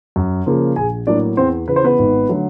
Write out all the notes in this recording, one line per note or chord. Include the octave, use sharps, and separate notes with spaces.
F#2
C#3 F3 A#3
A#1 G#4 G#5
A2 F#3 A#3 D4 D5
E2 C4 C5
C#3 E3 B4
C5
B3 B4
G#1
D3 F#3 A3